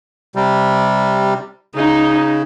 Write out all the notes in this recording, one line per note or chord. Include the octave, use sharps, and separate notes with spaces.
C3 G3
C#3 D#4